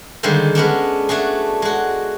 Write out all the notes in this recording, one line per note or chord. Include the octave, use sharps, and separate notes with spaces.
D3 D#3 G3 G#3 A#3 C5
G#3 B3 C#4 D4
A3 D4 F#4 G#4
G#3 F#4